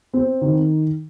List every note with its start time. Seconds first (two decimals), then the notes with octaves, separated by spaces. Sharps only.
0.13 C4
0.41 D#3